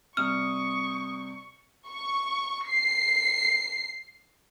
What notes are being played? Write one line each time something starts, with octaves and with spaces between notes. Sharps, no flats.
C3 G3 C#6 D#6 F6
C#6
C7